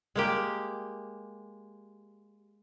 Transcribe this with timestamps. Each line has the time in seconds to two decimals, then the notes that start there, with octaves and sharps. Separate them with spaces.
0.16 G#3 A#3 G4